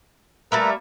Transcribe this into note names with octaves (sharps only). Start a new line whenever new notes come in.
G3 A3 A#3 A#4 B4 E5